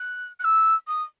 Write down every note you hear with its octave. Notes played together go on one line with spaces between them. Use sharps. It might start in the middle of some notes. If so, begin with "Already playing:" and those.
Already playing: F#6
F#6
E6
D#6